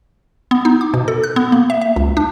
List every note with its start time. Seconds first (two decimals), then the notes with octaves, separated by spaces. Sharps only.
0.51 B3
0.65 D#4
0.81 D6
0.94 B2
1.08 A4
1.24 F#6
1.36 B3
1.52 A#3
1.70 E5
1.81 E5
1.96 C#2
2.17 D4